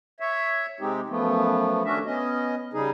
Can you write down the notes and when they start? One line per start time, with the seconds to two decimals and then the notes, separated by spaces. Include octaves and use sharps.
0.20 C#5 E5
0.80 C3 G#3 C4 D#4 G4
1.09 F#2 F3 A3 B3
1.85 D#2 A3 C#4 D4 F#4 E5
2.06 B3 C#4 D#5
2.73 C#3 G3 D#4 G#4